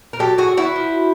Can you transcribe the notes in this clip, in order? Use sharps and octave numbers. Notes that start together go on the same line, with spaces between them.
A#4
F#3 G4 A4
F#4 G#4
D3
E4 F#4
F3